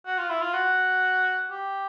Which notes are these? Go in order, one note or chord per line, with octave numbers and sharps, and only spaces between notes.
F#4
F4
E4
F4
F#4
G4